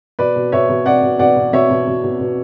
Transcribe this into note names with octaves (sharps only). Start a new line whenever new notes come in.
B2 B4 D5
B2
B2 C#5 E5
B2
B2 D5 F#5
B2
B2 D5 F#5
B2
B2 C#5 E5
B2
B2
B2
B2